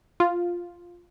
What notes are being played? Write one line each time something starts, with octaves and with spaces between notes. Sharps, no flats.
F4